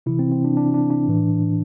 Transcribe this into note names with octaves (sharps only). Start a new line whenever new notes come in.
C3 E3 E4
C4
C4
D4
D4
D4
D4
A2 E3